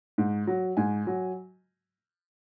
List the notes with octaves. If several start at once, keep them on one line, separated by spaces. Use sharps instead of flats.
G#2
F#3
G#2 G#5
F#3